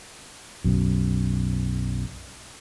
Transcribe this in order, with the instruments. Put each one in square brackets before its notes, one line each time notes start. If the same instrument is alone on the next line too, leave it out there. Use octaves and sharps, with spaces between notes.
[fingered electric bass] B1 F#2